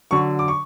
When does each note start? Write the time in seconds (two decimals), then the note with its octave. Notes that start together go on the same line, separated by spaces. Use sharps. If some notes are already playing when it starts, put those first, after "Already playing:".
0.11 D3 F#3 C#6
0.39 D6
0.48 C#6